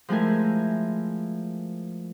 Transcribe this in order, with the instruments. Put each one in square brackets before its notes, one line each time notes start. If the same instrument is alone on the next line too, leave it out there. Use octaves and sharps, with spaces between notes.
[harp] F3 G#3 A3 E4 A#4 G#5